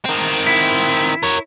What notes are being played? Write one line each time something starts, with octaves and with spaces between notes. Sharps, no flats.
D#3 C4
E4
A#4 C#5